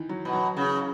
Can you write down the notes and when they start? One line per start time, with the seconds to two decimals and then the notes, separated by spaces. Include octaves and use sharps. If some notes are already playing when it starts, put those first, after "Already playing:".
Already playing: D#3 E3
0.09 F#3
0.25 B2
0.33 F#3
0.57 C#3